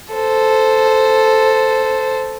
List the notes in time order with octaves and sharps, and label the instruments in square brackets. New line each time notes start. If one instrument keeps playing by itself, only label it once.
[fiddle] A4 C5